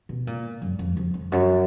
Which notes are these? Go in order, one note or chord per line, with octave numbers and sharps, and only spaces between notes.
B2
A#2
F#2
F2
F2
F2
F#2